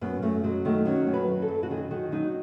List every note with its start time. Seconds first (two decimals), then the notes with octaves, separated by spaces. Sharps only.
0.01 F#2 B3
0.22 F#2 A3
0.44 F#3 G#3
0.65 D#3 A3
0.85 F#3 C#4
1.07 F#2
1.14 B4
1.28 F#2
1.42 A4
1.48 F#2
1.63 F#4
1.70 D#3 G#4
1.90 D#3 F#4
2.12 F#3 D#4